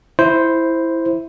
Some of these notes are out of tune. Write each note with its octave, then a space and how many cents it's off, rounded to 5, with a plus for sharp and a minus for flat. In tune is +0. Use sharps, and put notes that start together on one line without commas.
E4 +0 C5 +0